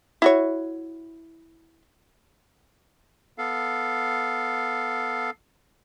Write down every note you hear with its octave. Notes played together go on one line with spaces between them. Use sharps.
E4 F#4 C#5
B3 A4 F5